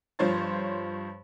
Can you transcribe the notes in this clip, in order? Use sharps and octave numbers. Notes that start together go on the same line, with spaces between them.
G2 F3 C5 C#5 C6 A6